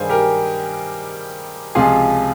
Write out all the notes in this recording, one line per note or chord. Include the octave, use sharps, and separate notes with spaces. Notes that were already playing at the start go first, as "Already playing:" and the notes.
Already playing: G2 D#3 G3 G#4 C5 F5 G#5
G4 A#4
C#2 C3 F3 F4 G#4